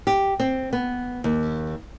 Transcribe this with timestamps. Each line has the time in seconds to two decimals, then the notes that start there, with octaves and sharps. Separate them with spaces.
0.07 G4
0.40 C4
0.73 B3
1.24 D#2